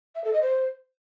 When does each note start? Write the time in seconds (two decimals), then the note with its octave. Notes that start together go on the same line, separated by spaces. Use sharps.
0.15 E5
0.24 A4
0.33 D#5
0.42 C5